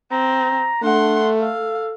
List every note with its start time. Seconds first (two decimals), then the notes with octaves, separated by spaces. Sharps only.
0.11 C4 A#5
0.83 A3 D4 F#5 C6
1.40 A4 F5